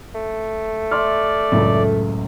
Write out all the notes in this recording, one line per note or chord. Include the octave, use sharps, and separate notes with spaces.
A3
D5 E5 C6 F6
C#2 F#2 A2